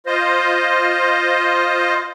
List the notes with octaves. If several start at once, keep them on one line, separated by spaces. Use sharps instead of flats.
F4 C5 D#5